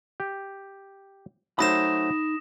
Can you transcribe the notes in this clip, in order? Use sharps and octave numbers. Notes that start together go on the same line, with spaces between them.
G4
F#3 A3 D#4 C5 B5 D#6 A#6 E7